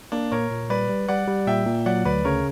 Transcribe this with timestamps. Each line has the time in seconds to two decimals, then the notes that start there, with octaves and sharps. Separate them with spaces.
0.12 A#3 D4
0.31 A#2 A#4 C#5
0.50 A#2
0.70 G3 B4 D5
0.89 G3
1.08 G3 D5 F#5
1.27 G3
1.47 A#2 E5 G5
1.66 A#2
1.86 F#3 D5 F#5
2.05 D2 B4 D5
2.25 C#3 A#4 C#5